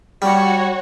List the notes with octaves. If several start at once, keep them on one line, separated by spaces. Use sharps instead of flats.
G3 F#4 C#5